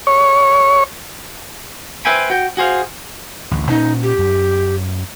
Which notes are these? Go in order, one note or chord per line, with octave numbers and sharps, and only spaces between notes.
C#5
B4 C5 E5 G5 G#5 B5
F#4 G5
F#4 G#4 C5 F5
A1 D2
A#2 C#4 D#4
G4
F#2